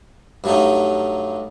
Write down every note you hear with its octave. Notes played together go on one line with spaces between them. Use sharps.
G2 F#3 A3 D#4